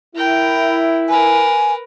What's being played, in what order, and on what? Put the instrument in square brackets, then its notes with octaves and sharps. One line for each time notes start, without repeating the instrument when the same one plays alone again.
[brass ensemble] E4 [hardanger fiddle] A#4 G5
[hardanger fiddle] A#4 B4 [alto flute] G#5